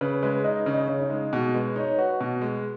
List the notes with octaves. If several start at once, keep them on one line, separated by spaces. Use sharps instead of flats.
C#3 B4
G#3 B4
D#4 D#5
C#3 C#5
D#5
C#5
C#3
D#4
G#3
B2
G#3 B4
D#4 C#5
F#4 B4
B2
G#3